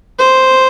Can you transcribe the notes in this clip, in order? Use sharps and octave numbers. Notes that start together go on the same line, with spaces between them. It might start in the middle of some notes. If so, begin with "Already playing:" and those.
C5